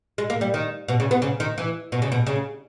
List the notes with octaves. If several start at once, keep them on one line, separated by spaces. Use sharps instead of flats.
G#3
A#3
G3
D#3
B2
C#3
B3
C#3
D#3
E3
B2
C#3
B2
C#3